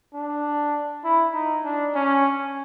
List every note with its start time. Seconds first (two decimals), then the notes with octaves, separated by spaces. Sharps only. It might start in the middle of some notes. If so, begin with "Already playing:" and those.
0.14 D4
1.04 E4
1.33 D#4
1.64 D4
1.95 C#4